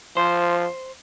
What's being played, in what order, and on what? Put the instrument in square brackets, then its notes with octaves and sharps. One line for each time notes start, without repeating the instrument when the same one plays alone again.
[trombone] F3 [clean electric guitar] C5